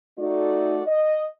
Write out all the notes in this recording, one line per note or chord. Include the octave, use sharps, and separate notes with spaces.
A3 D#4 F#4 D5
D#5